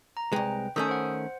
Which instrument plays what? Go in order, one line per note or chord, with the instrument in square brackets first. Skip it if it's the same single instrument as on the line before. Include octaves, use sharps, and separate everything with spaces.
[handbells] A#5
[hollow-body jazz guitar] C2 G#3 [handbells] B4 G5
[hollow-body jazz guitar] D#3 A3 C#4 [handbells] D#6 E6 G6
[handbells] C5 F#5